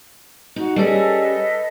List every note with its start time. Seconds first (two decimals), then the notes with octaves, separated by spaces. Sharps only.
0.56 D#4 F#4
0.76 G3 C#4 G#4 A4 B4 D#5